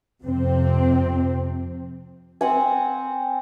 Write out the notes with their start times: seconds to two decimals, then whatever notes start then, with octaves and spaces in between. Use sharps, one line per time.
0.23 F2 C3 C4
2.41 C4 F#5 G#5